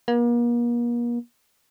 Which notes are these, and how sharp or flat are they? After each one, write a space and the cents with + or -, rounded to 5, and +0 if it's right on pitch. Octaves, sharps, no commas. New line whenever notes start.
A#3 +40